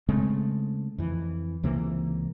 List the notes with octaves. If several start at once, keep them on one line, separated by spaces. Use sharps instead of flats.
C#3 G#3 A3 C4
F2 E3
C#2 C3 E3 A#3